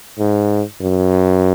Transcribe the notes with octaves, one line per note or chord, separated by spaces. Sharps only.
G#2
F#2